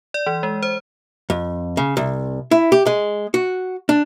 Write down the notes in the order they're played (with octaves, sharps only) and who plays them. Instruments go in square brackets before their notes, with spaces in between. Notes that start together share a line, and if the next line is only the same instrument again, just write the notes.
[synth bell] D5
E3
G#3
C5
[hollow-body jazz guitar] F2
C#3
C2
E4
G4
G#3
F#4
D4